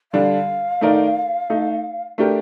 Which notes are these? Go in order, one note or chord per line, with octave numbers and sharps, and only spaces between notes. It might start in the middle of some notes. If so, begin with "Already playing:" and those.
D3 G3 D4 F5
D#3 A3 D#4 A#4 D5
A3 D#4 A4
A3 D4 G4 A#4